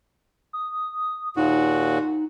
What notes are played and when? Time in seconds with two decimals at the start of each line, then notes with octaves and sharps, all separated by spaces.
0.53 D#6
1.37 D#2 A#2 D#4 F#4